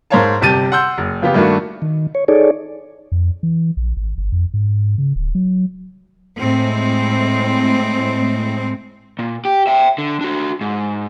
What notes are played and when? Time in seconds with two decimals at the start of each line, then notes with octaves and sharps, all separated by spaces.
0.10 G#2 A#4 C5 C#5 F5 A5
0.41 G1 C3 G4 A5 A6 D#7
0.72 F#5 C6 E6 G6
0.98 F#1
1.22 C#3 F3 B3 F4 G4
1.34 G2 D#3 A3 A#3 D4 F#4
1.82 D#3
2.15 C#5
2.28 D#4 G#4 A4 C#5 D5
3.12 F2
3.43 E3
3.77 A#1
3.97 G#1
4.18 G1
4.32 F2
4.54 G#2
4.98 C#3
5.16 D1
5.35 F#3
6.38 A2 G#3 C4
9.19 A#2
9.45 G4
9.67 E5 G5
9.98 D3
10.21 D4 F#4
10.61 G#2